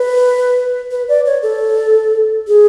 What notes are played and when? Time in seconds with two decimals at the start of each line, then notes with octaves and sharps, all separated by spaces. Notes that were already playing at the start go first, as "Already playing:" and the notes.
Already playing: B4
0.91 B4
1.08 D5
1.26 C#5
1.43 A4
2.48 G#4